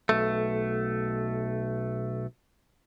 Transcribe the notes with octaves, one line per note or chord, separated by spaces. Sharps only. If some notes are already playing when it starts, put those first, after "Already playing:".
B1 A3